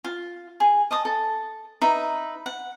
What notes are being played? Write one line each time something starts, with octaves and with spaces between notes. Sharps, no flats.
F4
G#4
D#5 A5 D#6
A4
D#4 B4 E5
F#5